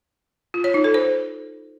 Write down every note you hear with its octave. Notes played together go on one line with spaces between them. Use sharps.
F4
C#5
D#4
A4
C5